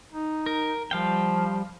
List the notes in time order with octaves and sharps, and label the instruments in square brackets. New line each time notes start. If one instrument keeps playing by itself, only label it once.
[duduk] D#4
[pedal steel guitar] A#4
[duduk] F3 [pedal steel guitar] G3 F5 G5